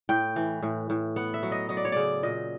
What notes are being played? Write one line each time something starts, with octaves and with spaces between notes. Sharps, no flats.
A2 G5
E3
A2
A2
B3 F#5
E5
F#3
D#5
F#3 D#5
D5
C#5
C#3 D5
A#2 D#5